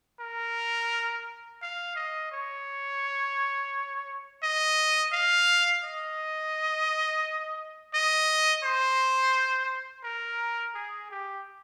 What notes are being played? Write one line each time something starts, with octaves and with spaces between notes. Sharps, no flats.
A#4
F5
D#5
C#5
D#5
F5
D#5
D#5
C5
A#4
G#4
G4